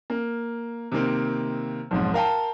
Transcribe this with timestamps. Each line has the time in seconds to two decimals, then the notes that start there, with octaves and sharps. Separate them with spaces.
0.10 A#3
0.92 C3 D#3 A#3 C4
1.91 B1 F2 G#2
2.14 A#4 F5 G5 A5